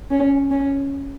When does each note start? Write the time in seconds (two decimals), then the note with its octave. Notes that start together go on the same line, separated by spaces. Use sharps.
0.11 C#4
0.51 C#4